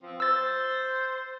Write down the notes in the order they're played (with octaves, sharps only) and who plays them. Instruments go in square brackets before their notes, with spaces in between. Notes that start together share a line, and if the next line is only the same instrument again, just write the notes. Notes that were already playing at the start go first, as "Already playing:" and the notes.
[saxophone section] F3 C4
[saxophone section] C5 [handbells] E6 A6